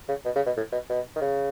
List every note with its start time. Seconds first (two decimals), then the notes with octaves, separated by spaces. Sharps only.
0.09 C#3
0.25 B2
0.36 C#3
0.46 B2
0.57 A2
0.72 B2
0.90 B2
1.16 D#3
1.21 C#3